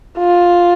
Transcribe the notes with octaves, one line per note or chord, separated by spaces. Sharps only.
F4